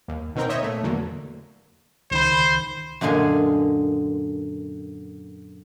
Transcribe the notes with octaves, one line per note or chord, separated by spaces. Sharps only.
D#2
B2 D#3 C4 A#4 G5
C5 C#5 D#5 E5
A#2 A3
E2 D3 F#3 A#3
C#2 D#3 C5 B5
F#2 A#2 D3 G#3 G#5 C6